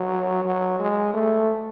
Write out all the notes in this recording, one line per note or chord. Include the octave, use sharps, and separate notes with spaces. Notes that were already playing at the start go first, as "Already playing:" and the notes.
Already playing: F#3
F#3
G#3
A3